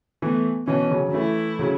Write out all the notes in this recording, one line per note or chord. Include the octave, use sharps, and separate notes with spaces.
E3 A3 B3
B2 E3 C#4
C#3 F#3
F#3
E3 A3 E4
C#3 F#3